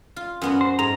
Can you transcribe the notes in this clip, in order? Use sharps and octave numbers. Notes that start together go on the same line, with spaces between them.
F4
F#2 B3 F#4
C5
G#2 A#5